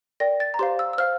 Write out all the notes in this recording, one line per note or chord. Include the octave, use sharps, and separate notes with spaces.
A#4 D5 G5 A#6
A6
A#5
G4 C5 F5 C6
E6
E6
C5 F5 F6